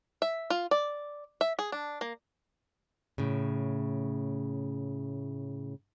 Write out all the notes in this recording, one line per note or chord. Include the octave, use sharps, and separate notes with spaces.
E5
F4
D5
E5
G#4
D4
A#3
A2 C#3